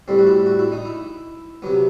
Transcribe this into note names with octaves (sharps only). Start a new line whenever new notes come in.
A2 G3 C4
F#4
E4
F#4
E4
D#4
E4
C3 F#3 B3